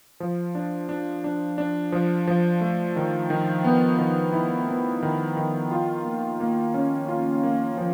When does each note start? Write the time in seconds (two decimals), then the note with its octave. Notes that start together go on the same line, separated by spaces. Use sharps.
0.20 F3
0.55 D4
0.89 D4
1.24 D4
1.58 D4
1.92 F3
2.27 F3
2.61 A3
2.96 D#3
3.30 D#3
3.64 B3
3.99 D#3
4.33 E4
4.68 B3
5.03 D#3
5.37 D#3
5.71 F4
6.05 A#3
6.40 A#3
6.74 C#4
7.08 F4
7.43 A#3
7.78 F3